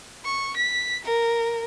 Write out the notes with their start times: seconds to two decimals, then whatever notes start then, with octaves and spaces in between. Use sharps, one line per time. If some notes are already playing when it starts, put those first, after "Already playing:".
0.25 C#6
0.56 B6
1.05 A#4